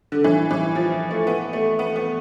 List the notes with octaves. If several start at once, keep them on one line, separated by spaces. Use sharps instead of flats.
D3
E3
E3
F3
A3
B3
A3
B3
B3